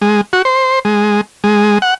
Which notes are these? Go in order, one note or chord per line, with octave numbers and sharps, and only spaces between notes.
G#3
F#4
C5
G#3
G#3
F#5